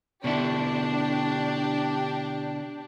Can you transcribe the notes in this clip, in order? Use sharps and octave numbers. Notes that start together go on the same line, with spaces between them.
B2 D3 D4 E4 G4